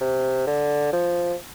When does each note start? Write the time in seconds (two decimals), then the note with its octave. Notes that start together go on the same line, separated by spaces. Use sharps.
0.01 C3
0.47 D3
0.93 F3